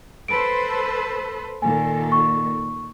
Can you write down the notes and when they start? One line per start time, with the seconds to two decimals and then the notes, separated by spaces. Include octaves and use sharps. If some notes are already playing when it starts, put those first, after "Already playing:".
0.28 A4 B4 C5 D7
1.62 A#2 D#3 A4 G#5
2.12 C#6